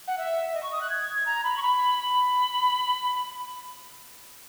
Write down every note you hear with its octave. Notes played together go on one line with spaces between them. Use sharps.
F#5
E5
D#5
C#6
D#6
F#6
G#6
A#5
B5
C#6
B5
B5